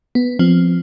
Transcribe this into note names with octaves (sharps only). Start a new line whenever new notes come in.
B3
F3 C4